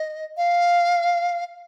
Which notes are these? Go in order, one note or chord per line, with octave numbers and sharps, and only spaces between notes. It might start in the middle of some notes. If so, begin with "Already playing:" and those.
Already playing: D#5
F5